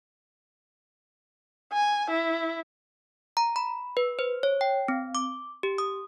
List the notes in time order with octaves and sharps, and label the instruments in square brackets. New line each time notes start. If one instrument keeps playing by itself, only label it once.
[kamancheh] G#5
E4
[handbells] A#5
B5
B4
C5
C#5
G5
C4
D6
G4
D#6